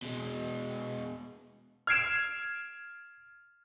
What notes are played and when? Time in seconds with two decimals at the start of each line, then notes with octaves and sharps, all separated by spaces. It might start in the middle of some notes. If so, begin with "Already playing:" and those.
0.02 B2 G#3
1.87 F6 G#6 C7 D7 E7